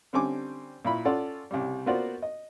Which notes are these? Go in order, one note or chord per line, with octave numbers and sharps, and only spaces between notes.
D3 G3 C4 C#4 G#5 D6
A#2 E4 B5
C#4 F4 A4 D5 F#5
C2 C#3 G3
A#3 B3 F4 F#4 C5 D5
D#5